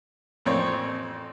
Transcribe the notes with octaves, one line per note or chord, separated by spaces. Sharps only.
A1 F2 C4 C#5 D5